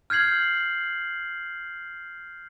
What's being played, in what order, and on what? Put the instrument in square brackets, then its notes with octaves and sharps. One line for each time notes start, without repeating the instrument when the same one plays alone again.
[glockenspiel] F6 G6 G#6 C7 F#7